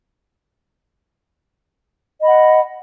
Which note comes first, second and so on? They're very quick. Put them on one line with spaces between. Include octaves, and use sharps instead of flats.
D#5 B5 F#5